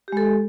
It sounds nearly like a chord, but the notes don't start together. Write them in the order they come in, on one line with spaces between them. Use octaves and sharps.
G4 G#3 A4